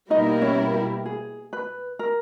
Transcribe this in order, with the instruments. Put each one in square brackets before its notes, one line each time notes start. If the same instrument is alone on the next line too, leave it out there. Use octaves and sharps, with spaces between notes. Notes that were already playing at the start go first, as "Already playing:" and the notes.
[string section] B2 G3 A#3 E4 A#4 [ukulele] D#4 D#5
[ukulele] C#4 C#5
G4
G#4
B4
A#4